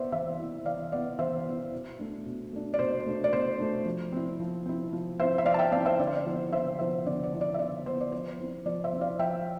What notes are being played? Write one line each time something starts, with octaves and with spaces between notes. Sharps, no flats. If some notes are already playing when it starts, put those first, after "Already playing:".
Already playing: B3 E4 C5 D5 E5
E3 C5 E5
B3 E4
E3 D5 F5
B3 E4 D5
E3 C5 E5
B3 E4
B2
A3 D4
B2
A3 D4
D5
B2 C5
A3 D4
D5
B2 C5
A3 D4
F3
C4 E4
F3
C4 E4
F3
C4 E4 C5 E5
E5
F3 D5 F5
A5
E5 G5
C4 E4 D5 F5
C5 E5
D3 D5
C5
D5
F3 B3 E4
D3 C5 E5
F3 B3 E4 C5 E5
D3 D5
D5
F3 B3 E4
D5
E5
D3 D5
F3 B3 E4 C5
D5
F3 C5
C4 E4
F3 D5
C5 E5
C4 E4
D5 F5
F3 E5 G5